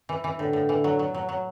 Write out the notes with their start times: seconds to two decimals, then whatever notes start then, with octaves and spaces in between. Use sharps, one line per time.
0.09 E3
0.24 E3
0.38 A2 D3
0.53 A2
0.69 E3
0.84 F#3
0.99 F#3
1.15 F#3
1.29 F#3